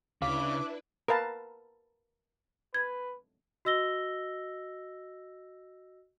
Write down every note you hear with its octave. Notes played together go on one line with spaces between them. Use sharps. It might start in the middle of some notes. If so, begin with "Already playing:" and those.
D2 C#3 D4 E4 B4 F5 D6 B6
A#4 B4 F5 A5
B4 G#6
F#4 D#5 E6 A#6 G7